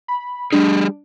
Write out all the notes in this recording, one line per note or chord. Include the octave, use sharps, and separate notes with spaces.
B5
G3 D4 G4 G#4